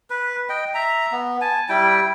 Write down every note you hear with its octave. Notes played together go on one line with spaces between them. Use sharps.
B4
D#5 G5
E5 A#5
B3
G#5 A5
G3 E4 G5